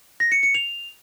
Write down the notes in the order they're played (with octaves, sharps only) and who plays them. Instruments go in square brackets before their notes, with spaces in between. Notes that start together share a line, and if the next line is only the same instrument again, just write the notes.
[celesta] A#6
C#7
C#7
F7